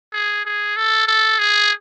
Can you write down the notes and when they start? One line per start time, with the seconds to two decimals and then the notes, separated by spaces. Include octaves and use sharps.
0.13 G#4
0.45 G#4
0.76 A4
1.07 A4
1.39 G#4